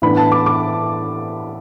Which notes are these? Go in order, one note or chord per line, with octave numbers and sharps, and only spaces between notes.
A2 E3 B3 D4 B5
A5
D6
D6